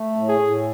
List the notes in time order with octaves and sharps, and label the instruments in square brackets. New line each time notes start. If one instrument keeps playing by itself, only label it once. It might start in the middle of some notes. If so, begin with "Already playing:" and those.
Already playing: [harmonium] A3
A2
[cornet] G#4
[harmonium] A2